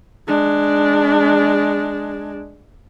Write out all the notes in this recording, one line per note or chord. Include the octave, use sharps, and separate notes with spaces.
G#3 D4